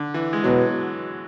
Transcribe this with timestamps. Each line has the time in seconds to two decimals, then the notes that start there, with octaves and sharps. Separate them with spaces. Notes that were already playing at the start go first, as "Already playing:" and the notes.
Already playing: D3
0.14 E3
0.33 G#3
0.44 B2 F#3